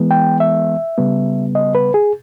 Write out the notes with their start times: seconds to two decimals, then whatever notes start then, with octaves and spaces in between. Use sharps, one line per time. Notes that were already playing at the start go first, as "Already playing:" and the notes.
Already playing: E3 G#3 B3
0.11 G5
0.40 E5
0.98 C#3 G3 B3
1.55 D#5
1.75 B4
1.94 G#4